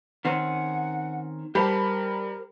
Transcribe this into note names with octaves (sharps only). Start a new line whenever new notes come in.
D#3 C4 C#4 F#5
G3 G4 A#4 C5 A5 B5